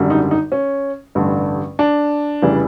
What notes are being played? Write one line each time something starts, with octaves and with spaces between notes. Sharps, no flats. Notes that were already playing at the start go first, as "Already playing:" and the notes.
Already playing: G#1 F#2 D3 G3
D#4
D#4
C#4
A1 G2 D3 G3
D4
F1 C#3 E3 G3